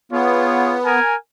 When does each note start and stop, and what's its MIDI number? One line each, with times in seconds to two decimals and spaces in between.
0.12 0.99 59
0.12 0.75 65
0.12 0.75 68
0.12 0.75 73
0.84 1.14 70
0.84 1.14 80